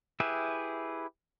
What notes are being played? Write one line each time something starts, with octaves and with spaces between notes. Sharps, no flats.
E4 G4 G#4 B4 E5